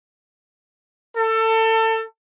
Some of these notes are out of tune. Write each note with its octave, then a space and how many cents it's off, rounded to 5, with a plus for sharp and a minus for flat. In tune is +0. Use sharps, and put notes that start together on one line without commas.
A4 +25